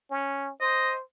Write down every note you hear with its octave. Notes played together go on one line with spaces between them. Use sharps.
C#4
C5 D#5